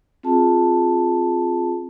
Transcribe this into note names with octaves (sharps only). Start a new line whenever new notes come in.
C4 F4 G#4 A5